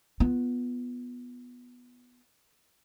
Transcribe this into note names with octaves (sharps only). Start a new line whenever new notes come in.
B3 F4